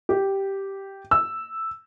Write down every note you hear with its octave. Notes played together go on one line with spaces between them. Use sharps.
G4
E6